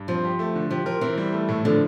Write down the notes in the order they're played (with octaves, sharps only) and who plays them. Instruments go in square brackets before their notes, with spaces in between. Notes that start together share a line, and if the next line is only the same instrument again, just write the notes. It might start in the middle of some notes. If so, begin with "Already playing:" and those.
Already playing: [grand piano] G2
[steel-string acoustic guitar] F3 [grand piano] C4
[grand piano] G4
A3
D3
[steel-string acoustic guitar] F3 [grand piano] G4
[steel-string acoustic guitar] F3 [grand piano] A#4
[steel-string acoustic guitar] E3 [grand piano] C4
[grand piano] G3
A3
A2
[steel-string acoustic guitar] D3 [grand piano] F3